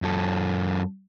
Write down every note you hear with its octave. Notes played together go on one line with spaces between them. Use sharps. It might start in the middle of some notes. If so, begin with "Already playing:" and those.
F#2 A4